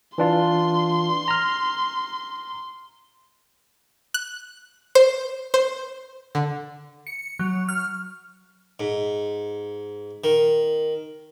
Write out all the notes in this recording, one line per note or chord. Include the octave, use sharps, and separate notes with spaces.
E3 D4 F4 C6
A#5 F6
F#6
C5
C5
D3
C#7
F#3
F6
G#2
D#3